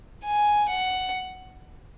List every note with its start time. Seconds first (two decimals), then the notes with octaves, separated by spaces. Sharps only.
0.24 G#5
0.70 F#5